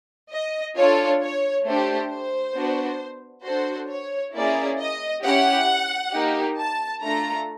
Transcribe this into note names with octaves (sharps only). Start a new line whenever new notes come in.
D#5
D4 F4 A4 C#5
C#5
A3 D4 G4 C5
C5
B3 D4 F#4
D4 F#4 A4 C5
C#5
A#3 C#4 E4 G#4 D5
D#5
C#4 E4 G4 F#5
A#3 D#4 G4
A5
A3 D4 F4 A4 A#5